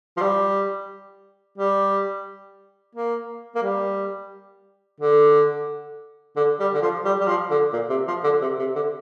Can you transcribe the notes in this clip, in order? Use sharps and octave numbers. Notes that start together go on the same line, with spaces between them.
F3
G3
G3
A#3
A#3
G3
D3
D3
G3
D3
F3
G3
G3
F3
D3
A#2
C3
F3
D3
C3
C3
D3